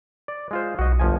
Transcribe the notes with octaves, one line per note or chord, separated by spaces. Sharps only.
D5
G#3 F4 C5
B1 F#4 D#5
G1 F3 G#5